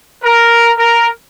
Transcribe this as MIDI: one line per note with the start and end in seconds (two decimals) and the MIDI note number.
0.23 0.72 70
0.78 1.08 70